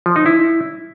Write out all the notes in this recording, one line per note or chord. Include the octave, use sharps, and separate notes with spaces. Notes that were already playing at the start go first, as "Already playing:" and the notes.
F3
D#4
E4